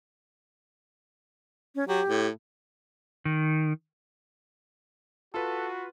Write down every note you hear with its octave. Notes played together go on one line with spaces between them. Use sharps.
C#4
F#3 G4
A2
D#3
F4 F#4 A4 B4